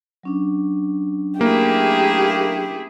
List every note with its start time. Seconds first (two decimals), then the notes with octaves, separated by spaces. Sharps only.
0.23 F#3 C#4 D4
1.41 A3 A#3 E4 G4 G#4